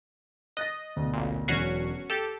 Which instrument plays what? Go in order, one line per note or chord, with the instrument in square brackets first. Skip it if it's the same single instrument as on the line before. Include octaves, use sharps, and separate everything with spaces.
[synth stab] D#5 [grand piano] F#6 A6 A#6
[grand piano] D2 B2
[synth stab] A1 A#2
[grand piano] E1 F#3 C7 [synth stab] C#4 F#4 C#6
[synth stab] G4 A4 [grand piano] G5